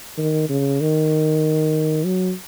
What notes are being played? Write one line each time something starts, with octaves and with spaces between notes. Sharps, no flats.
D#3
C#3
D#3
F#3